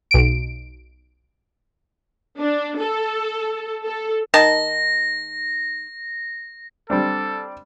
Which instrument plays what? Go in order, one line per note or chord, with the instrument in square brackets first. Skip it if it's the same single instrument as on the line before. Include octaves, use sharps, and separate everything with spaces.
[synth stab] B1 D7
[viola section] D4
A4
A4
[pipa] D#3 A5 [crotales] A#6
[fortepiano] G3 C4 D4 [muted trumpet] A4